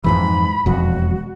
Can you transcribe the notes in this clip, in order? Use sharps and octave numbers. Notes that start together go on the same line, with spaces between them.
F2 G#2 E3 B5
E1 F2 F#4